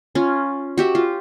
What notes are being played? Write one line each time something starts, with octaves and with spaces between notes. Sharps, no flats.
C#4 F4
F#4 G4 E5
F4